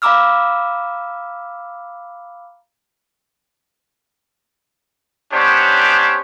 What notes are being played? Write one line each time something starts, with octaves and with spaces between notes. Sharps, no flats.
F5 A#5 B5 D6 E6 F6
B3 C#4 D4 G4 C5 C#5